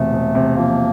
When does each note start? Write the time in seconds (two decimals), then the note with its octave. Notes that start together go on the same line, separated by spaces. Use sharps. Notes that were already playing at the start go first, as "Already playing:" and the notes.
Already playing: E1 C3 A3
0.13 E1
0.35 C3
0.57 F3 A#3